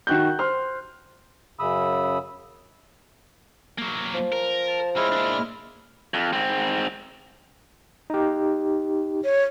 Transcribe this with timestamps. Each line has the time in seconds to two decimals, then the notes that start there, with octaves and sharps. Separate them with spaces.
0.07 D#3 F#4 F#6 G6
0.39 C5 C6 F6
1.59 F#2 C#3 B5 D#6 E6
3.78 F#3 A#3
4.14 F3
4.32 A#4
4.68 A5
4.97 G#3 C4 E4 C#5 F6
5.12 A#3 D4
6.14 F2
6.33 G#2 C4
8.10 D#4 G4
9.24 C#5